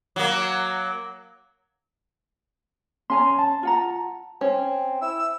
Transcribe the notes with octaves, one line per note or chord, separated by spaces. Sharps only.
F#3 A#3
C#4 G#5 A#5 C6
A5
F4 F#5 A#5
C4 C#4
E4 E6